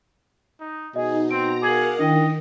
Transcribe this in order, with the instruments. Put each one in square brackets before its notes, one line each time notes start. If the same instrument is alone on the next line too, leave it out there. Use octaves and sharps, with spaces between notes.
[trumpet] D#4
[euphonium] B2 [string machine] D#4 [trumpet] G#4 [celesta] D#5
[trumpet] C4 [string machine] A#5 [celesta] D7
[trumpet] G#4 [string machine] A#4 F5 F#5 [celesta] D6 G#6 F#7
[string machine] D#3 [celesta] D4 E4 G5 [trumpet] D#5